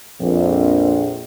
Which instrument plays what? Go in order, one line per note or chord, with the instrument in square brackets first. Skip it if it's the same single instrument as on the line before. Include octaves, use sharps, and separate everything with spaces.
[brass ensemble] A#1 F2